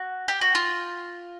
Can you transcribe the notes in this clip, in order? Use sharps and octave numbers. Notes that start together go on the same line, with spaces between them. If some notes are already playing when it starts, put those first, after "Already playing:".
Already playing: F#4
G4
F#4
F4